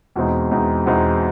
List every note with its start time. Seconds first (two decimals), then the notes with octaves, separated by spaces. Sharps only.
0.16 E2 B2 G#3 C4 D#4
0.51 E2 B2 G#3 C4 D#4
0.86 E2 B2 G#3 C4 D#4